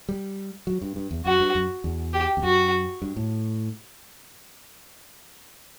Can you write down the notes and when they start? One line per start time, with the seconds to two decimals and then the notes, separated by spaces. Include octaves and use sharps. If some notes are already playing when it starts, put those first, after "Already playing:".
0.09 G3
0.67 F#3
0.82 G2
0.96 G2
1.11 E2
1.25 F#2 F#4
1.40 G2
1.55 F#2
1.84 E2
2.13 G4
2.37 E2
2.43 F#2 F#4
3.02 G2
3.17 A2